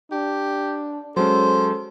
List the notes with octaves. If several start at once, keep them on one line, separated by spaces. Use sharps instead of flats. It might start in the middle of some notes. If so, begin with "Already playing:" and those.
D4 G4
F#3 G#3 C#4 A4 C5